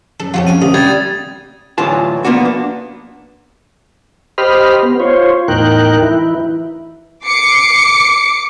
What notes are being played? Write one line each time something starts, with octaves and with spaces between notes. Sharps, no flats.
F#2 A4
F2 F4 F#4 A4 C#5 G5
A#3 C#4 D4 D#7
D2 C3 D#6
G3 G#6 A6
D2 A2 E3 F#3 F4 A5
F3 A#3 B3 D4 F#4
D4
G4 C5 D#5 B5 F6
B3
F4 C5 C#5
E2 A2 D#4 A#4 G5 F#6
E3 E4
D6 C7 C#7